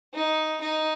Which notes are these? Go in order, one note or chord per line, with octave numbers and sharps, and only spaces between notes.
D#4
D#4